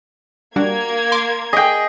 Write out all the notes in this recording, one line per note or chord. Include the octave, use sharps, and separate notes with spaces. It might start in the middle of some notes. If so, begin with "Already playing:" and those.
G3 A#3 D4 F#4 G#6
C6 D6
G#4 D#5 G5